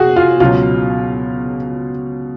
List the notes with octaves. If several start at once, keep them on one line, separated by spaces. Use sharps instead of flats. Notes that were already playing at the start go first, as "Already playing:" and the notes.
Already playing: F#4 G#4
F4
C#2 B2 F#3 F4